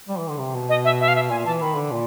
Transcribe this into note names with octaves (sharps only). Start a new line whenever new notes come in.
G3
E3
D3
C3
B2
D#5
E5
E5
F5
E5
A#2 G#5
E3 A5
D#3 B5
D3
A#2